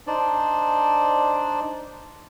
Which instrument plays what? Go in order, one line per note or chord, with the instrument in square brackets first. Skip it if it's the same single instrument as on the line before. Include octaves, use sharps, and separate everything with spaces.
[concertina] D4 D#4 C5 D5